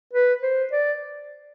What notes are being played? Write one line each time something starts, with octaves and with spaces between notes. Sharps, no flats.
B4
C5
D5